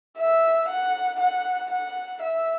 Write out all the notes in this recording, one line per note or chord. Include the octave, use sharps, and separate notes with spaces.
E5
F#5
F#5
F#5
E5